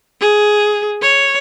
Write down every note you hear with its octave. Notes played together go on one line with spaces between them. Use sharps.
G#4
C#5